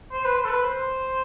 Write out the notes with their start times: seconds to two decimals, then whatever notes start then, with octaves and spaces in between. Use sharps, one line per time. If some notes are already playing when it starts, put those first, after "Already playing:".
0.12 C5
0.24 B4
0.38 C5
0.44 A4
0.49 B4
0.62 C5